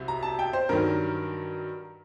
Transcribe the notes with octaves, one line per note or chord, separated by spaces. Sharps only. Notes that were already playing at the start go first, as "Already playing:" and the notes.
Already playing: C2 C3 F#3
A#5
A5
G5
C5
G2 D#3 F#3 A#4